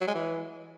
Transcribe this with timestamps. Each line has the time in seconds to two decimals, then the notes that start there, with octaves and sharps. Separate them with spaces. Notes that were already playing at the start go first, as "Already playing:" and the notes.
0.01 F#3
0.08 G#3
0.15 E3